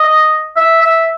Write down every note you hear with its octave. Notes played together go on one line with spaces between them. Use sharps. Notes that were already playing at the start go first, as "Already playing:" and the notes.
Already playing: D#5
E5
E5